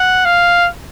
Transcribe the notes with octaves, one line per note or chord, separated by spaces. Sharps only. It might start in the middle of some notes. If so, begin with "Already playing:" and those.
Already playing: F#5
F5